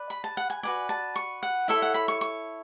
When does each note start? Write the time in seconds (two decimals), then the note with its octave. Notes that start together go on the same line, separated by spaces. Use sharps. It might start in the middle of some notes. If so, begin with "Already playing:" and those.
Already playing: B4 D5
0.10 B5
0.24 A5
0.37 F#5
0.50 G#5
0.63 F#4 B4 D5 G#5
0.89 A5
1.16 C#6
1.43 F#5
1.68 E4 A4 C#5 E5
1.82 F#5
1.94 B5
2.08 C#6
2.21 C#6